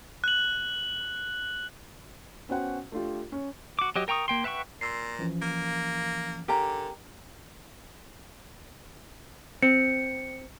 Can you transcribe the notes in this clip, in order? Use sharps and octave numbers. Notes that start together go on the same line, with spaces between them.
F#6 F#7
B3 C#4 F#4 C5 F#5 G5
A3 D4 F4 G4
C#4
F#4 D6
F#3 G4 D#5
A#4 G5 A#5 C#6 D#6
A#3 G5 C6
B4 E5 F#5 G5 C#6
A#2 C6 E6 C7
E3 F3 C#4
A#3
D3 G4 A#4 G#5 A#5
C4 C#7